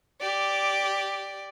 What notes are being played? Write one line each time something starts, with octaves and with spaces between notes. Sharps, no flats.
G4 D5